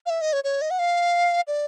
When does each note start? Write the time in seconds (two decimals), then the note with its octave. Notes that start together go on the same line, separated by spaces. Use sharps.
0.06 F5
0.10 E5
0.21 D#5
0.33 C#5
0.44 C#5
0.62 D#5
0.71 F#5
0.79 F5
1.47 D5